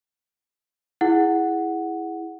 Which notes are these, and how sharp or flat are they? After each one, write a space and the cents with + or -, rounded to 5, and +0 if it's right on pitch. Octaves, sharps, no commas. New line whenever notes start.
E4 +0 G#4 +0 F#5 +0